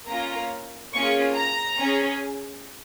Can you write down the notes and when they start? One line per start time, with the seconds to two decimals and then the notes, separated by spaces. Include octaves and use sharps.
0.08 A#3 C#4 F4 A#5
0.93 A#3 C#4 F4 G#4 C#6
1.36 A#5
1.78 C#4 G#4